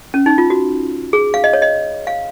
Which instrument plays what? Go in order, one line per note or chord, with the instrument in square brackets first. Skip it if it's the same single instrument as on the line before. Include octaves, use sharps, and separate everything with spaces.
[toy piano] C#4
D#4
F4
F#4
G#4
F5
D#5
C#5
D#5
F5